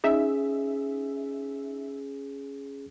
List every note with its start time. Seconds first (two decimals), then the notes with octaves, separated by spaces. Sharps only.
0.04 C#4 D#4 G#4 E5